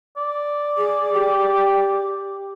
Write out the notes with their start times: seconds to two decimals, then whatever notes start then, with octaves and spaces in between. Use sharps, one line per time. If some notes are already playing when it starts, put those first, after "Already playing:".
0.17 D5
0.77 G#4
1.14 G4